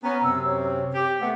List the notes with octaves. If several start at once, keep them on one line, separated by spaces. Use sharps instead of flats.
B3 C#4 A#5
F#2 C3 E6
C#5
G4
A3 B3 F#5